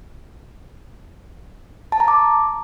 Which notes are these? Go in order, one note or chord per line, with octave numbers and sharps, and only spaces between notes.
A5
A#5
D6